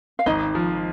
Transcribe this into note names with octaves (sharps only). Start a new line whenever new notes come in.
F5
G#1 D#4 D#5
F3